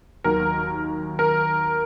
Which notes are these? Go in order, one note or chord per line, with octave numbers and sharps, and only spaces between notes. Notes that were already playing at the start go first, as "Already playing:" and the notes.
D#2 D#3 F#3 A#4
A#4